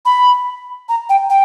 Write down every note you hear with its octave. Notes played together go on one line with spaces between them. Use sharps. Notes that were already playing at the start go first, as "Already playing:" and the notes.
B5
A#5
G5
G5